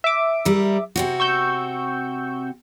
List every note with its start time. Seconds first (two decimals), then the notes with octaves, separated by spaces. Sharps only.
0.04 E5 D6
0.45 G3 A#4
0.96 C3 C4 F#4
1.20 C#6 E6 G6